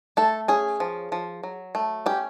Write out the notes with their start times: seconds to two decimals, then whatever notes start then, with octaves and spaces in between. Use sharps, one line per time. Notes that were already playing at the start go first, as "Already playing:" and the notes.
0.17 A3 A4
0.48 C#4 G#4
0.80 F3
1.12 F3
1.43 F#3
1.75 A3
2.06 C#4 G4